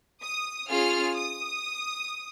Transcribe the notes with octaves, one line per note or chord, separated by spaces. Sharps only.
D#6
C#4 F4 G#4 F6
D#6